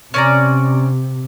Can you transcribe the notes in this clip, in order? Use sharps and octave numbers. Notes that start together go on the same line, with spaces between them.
C3 C#4 D5 A#5